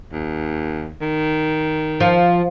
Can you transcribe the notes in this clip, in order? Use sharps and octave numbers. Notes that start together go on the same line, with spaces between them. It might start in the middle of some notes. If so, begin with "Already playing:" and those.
D#2
D#3
F3